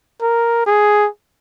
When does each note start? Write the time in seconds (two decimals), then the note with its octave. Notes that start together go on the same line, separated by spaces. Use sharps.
0.22 A#4
0.67 G#4